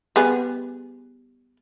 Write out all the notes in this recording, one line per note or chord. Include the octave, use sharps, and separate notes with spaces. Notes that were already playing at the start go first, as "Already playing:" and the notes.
G3 B3 G#4